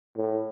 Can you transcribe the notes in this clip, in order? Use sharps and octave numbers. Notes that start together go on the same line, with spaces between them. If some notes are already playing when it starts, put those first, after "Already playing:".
A2